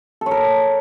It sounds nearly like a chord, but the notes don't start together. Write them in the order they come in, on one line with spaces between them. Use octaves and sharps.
A4 C#5 A#4